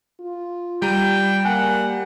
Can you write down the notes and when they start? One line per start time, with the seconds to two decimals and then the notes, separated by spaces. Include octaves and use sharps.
0.20 F4
0.82 G3 G5 A#5 D#7
1.45 A#3 F#5 G#5